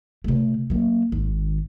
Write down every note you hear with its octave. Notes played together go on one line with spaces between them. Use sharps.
C3 A3
F#3 A#3
G#1 D#3